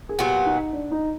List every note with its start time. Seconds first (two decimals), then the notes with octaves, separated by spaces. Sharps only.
0.09 G#4
0.19 A#2 F#3 B3 G4
0.46 D#4
0.73 D4
0.91 D#4